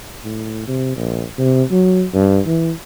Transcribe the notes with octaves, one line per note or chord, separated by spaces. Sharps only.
A2
C3
A#1
C3
F#3
G2
E3